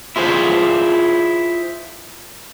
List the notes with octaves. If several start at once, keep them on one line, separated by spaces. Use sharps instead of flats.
E4 F4 G#4 C5